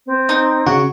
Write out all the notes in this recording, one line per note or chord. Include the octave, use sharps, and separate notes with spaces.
C4
D#4
C#3 F#4